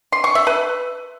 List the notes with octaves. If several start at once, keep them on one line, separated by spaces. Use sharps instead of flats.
C6
C#6
E5
B4